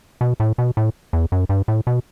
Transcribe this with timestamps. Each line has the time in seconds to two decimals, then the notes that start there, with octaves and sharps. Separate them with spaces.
0.21 B2
0.40 A2
0.58 B2
0.77 A2
1.13 E2
1.32 F#2
1.49 G2
1.68 A2
1.87 B2